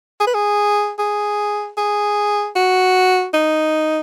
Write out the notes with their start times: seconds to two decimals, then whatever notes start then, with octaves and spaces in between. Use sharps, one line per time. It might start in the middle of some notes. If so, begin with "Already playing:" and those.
0.20 G#4
0.27 B4
0.34 G#4
0.99 G#4
1.78 G#4
2.56 F#4
3.34 D#4